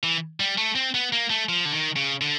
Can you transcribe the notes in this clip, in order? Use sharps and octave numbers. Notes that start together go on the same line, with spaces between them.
E3
G3
A3
C4
B3
A#3
A3
F3
D3
D#3
C#3
D3